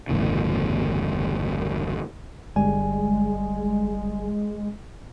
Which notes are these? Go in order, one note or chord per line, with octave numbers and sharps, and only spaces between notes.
G1 E2 A2 C#3
G1 G3 G#3 G#5